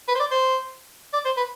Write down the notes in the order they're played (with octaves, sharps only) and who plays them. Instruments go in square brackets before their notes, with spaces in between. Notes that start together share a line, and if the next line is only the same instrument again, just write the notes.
[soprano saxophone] B4
C5
D5
C5
D5
C5
B4